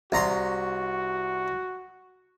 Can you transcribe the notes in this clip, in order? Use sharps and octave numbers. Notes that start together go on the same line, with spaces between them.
C2 F#4 A#5 C6